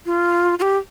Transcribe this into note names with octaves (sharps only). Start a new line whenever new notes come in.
F4
F4
G4